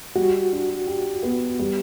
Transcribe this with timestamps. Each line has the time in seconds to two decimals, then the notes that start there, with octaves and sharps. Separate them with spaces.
0.16 G3 F#4
0.52 D4
0.87 G4
1.23 B3
1.59 G3